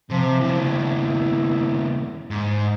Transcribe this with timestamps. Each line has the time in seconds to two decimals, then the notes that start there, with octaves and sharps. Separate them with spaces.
0.11 C3 F3
0.41 D#2 C#3 E4
2.30 G#2